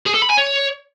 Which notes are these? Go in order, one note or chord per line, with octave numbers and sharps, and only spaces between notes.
G#4
A4
B5
G#5
C#5